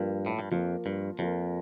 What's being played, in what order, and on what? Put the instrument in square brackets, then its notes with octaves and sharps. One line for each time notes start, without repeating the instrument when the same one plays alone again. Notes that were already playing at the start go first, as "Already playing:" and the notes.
Already playing: [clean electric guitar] G2 [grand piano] F3 A#3 F4 A#4
[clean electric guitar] A2
G2
[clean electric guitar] F2 [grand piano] F3 A#3 F4 A#4
[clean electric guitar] G2
[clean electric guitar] F2 [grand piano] F3 A#3 F4 A#4